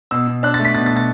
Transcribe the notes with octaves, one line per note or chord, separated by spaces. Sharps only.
B2 E6
B2
D4 F#6
A6
A3
B6
B2 A6
A6
B2
A6